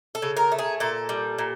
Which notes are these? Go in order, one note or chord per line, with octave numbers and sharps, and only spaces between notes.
A4
C#3
A#4
A3
G#4
A#2 A4
G3
A#2